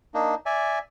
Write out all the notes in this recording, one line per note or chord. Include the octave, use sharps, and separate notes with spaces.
A#3 D4 D#4
D5 E5 G#5